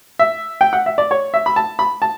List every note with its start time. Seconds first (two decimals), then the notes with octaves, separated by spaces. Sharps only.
0.19 E5
0.61 G5
0.73 F#5
0.86 E5
0.98 D5
1.11 C#5
1.34 E5
1.46 B5
1.56 A5
1.79 B5
2.02 A5